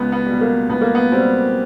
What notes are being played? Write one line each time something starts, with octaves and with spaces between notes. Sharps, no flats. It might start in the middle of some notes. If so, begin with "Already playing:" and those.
Already playing: C#2 B3
B3
G3
B2
A#3
C#2 B3
A#3
B3
B2 G3 C4